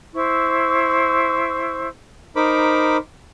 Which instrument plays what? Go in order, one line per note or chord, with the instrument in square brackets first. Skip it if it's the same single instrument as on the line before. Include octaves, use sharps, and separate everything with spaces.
[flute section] E4 C5 C#6 E6
[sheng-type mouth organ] D#4 A#4 C5 B5 D6